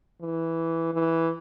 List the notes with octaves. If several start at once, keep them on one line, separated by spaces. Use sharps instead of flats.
E3
E3